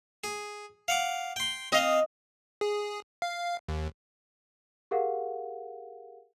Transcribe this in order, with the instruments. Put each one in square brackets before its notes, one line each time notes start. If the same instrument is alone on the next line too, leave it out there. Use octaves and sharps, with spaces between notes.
[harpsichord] G#4
F5 F#5 D6
G5 C6
[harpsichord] C4 F5 [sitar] D#5
[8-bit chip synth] G#4
F5
D#2
[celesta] G4 G#4 A#4 F5 F#5